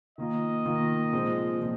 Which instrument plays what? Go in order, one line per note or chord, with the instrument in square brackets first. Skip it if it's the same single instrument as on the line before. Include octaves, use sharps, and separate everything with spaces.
[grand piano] D#3 A#3 F4 [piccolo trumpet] D#5
[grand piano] D#3 A#3 F4
A#2 F3 G#3 C4
A#2 F3